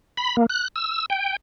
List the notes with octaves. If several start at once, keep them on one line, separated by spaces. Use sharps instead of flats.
B5
A#3
F#6
E6
G5